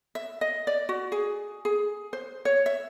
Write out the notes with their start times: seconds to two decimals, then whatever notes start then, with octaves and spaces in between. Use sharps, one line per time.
0.15 E5
0.41 D#5
0.67 D5
0.89 F#4
1.12 G#4
1.65 G#4
2.13 C5
2.45 C#5
2.66 E5